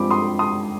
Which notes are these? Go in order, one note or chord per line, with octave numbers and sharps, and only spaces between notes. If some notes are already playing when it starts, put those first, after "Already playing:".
Already playing: G2 F3 G#3 C4 B5 D6
C6 D#6
C6 D#6